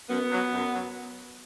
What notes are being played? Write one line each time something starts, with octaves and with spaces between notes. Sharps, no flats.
F#2 B3
F#3
F#2
F#3